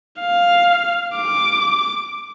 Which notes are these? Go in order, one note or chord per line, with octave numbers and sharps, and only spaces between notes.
F5
D6